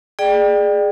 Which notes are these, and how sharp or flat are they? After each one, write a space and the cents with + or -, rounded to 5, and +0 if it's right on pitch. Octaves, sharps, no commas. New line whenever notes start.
G#4 +0 D5 +25 G5 +0